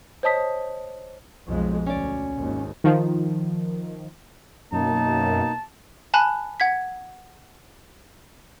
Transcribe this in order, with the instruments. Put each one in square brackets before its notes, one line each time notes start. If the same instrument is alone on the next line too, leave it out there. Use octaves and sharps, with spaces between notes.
[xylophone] C5 C#5 D#5 A5 D#6 B6
[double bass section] B1 F2 G#3
[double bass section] D2 [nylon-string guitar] C#4 D5
[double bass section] G#1 D#2
[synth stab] D#3 F3
[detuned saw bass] F#2 [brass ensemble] B2 A#3 [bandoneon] D#4 [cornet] A5
[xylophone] G#5 A5 B5 F#6
F#5 G#6 B6